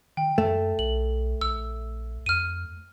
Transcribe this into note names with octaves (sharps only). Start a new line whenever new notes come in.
D#3 G5
F#2 A3
B1 F#7
A#1 E6
F2 F6 D#7